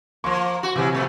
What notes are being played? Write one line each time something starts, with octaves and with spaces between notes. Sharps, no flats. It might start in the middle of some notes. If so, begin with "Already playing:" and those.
F3 A#3 C6 C#6
F#4
C3 E3 F#3 G4
F2 A#2 A3